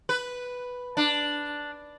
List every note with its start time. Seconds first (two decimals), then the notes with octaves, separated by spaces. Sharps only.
0.09 B4
0.97 D4